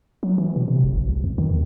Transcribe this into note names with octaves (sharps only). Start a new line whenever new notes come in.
F#3
E3
B2
C3
F#1
A#1
C#2
F2
D#3
D#2